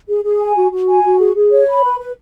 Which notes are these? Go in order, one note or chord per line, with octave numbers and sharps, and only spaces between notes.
G#4
G#4
G#5
F#4
F#4
G#5
F#4
G#4
G#4
C#5
B5
B4
B4